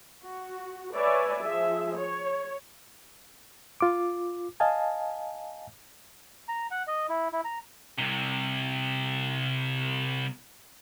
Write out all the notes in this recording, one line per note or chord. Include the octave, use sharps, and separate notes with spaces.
F#4
B4 C#5 D5 E5 G#5
F3 G#4 E5
C#5
F4 D6
D#5 F5 G#5 A5
A#5
F#5
D#5
E4
E4
A#5
C2 C3